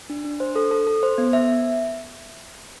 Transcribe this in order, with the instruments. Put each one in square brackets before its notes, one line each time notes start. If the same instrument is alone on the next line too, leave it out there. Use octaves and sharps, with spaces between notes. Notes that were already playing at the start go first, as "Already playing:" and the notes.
[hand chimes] D4
D4
C5
A4
A4
A4
C5
B3
E5